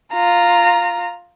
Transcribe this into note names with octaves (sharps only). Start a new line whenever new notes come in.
F4 A#5